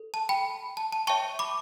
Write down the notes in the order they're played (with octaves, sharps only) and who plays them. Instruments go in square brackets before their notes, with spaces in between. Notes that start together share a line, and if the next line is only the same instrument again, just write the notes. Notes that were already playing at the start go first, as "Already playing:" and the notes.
Already playing: [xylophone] A4
A5
G5 B5
A5
A5
C#5 E5 G5 A5 C#6
B5 D6